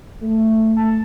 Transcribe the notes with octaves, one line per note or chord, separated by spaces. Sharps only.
A3
A5